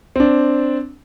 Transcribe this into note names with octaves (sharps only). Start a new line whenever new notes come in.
C4 D4